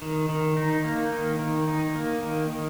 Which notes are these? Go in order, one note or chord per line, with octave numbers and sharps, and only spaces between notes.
D#3
D#3
D#4
A#3
D#3
D#3
D#4
A#3
D#3
D#3